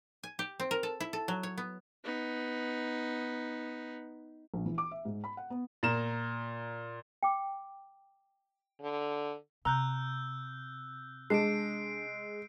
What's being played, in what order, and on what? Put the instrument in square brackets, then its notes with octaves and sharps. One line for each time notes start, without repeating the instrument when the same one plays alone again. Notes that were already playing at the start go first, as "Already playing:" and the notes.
[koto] G#5
G4
C4
A#4
A4
E4
A4
F#3
C#5
B3
[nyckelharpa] B3 D#4
[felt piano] A#1
E3
D6
E5
G#2
B5
F#5
B3
[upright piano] A#2 A#5 E7
[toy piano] G5 D6
[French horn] D3
[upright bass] C3 [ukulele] A#5 [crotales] E6 F#6 G6
[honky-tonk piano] G#3 [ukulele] D4 A5 [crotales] C7 D7